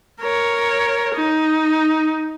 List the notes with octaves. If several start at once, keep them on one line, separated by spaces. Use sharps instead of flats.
A#4 C#5
D#4